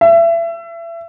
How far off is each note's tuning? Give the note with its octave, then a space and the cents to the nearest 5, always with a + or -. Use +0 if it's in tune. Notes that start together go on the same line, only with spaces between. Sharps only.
E5 +30